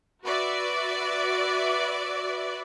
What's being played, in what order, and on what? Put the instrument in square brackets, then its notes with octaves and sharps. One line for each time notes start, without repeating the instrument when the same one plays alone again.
[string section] F#4 B4 D5 E5